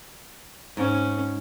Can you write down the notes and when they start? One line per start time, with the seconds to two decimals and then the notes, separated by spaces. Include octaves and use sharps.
0.77 G#2 C#4